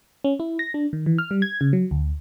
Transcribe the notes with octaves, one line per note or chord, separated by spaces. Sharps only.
C#4
E4
A#6
D4
D#3
E3
F6
G3
G#6
C#3
F#3
D2